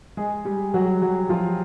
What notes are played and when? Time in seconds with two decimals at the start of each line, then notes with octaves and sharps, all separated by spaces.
0.17 G#3 G#4
0.45 G3 G4
0.74 F#3 F#4
1.02 F#3 F#4
1.29 F3 F4